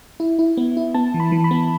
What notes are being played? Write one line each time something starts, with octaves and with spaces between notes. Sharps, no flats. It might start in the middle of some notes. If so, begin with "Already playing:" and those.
E4
E4
B3
E4
B3 A5
E3
B5
E3
B5
B3